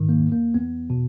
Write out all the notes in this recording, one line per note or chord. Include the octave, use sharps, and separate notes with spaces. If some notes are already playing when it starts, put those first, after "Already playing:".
Already playing: G#2 D#3
A#3
E2
A#3
E2 B3
B2